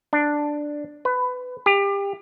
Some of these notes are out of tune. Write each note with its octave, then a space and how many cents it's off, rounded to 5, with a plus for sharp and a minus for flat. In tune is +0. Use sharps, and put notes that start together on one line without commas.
D4 +5
B4 +20
G4 +30